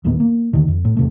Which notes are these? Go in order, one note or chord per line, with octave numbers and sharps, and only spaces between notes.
D#1 A1 D#2 B3
A#3
D#2 D3 D#3
F2
A2
E2 C3 A3